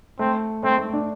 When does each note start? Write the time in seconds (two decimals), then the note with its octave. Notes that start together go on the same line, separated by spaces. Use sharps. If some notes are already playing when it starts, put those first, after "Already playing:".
0.19 A3 C4
0.63 A3 C4
0.78 A3
0.93 D4